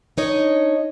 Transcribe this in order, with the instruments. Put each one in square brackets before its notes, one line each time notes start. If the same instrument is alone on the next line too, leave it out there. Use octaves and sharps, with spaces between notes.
[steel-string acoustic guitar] D4 D#4 C#5 D#5